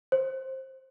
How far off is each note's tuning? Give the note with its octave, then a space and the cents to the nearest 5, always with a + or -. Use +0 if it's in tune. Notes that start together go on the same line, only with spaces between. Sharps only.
C5 +15